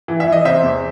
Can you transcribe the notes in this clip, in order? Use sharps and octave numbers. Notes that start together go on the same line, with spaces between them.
E3
E5
E3
D#5
C3 C5 E5
E2